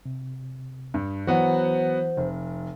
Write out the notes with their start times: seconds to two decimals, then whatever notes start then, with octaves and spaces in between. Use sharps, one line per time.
0.06 C3
0.94 G2
1.27 E3 F#3 B3 F#4 C5 F#5
2.17 F1